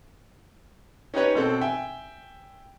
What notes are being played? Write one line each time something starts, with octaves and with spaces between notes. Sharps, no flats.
C#4 D#4 G4 B4 C#5
B2 C4 A4
E5 G5 G#5